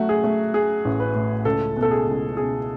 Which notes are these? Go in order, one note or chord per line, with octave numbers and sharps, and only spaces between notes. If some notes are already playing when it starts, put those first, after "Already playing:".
Already playing: F#3 A3 F#4
G#4
A3
A3 G#4
A1
B4
A2
C#2 A4
B2
A4
G#4
C#2
B2 G#4